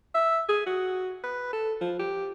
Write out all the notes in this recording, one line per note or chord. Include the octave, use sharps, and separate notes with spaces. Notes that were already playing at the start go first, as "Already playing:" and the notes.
E5
G#4
F#4
B4
A4
F3
G4